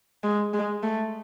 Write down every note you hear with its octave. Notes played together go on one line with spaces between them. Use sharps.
G#3
G#3
A3